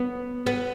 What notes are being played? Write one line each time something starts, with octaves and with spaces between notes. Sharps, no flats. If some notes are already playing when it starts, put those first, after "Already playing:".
Already playing: B3
B3